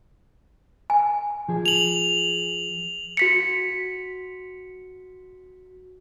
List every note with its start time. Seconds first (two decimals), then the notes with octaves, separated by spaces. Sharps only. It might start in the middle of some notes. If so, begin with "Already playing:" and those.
0.90 G#5
1.48 F3 G#4
1.66 F7 F#7
3.17 F#4 B6 C#7